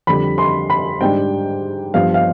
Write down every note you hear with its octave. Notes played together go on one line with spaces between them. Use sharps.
F2 D3 G3 B5
C6
B5
G#2 G3 D4 G5
G2 F3 B3 D4 F5
F5